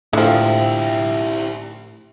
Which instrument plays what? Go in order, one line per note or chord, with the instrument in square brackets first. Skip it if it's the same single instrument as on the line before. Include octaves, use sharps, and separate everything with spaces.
[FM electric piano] A2 [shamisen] D3 F3 [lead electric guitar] E4 G4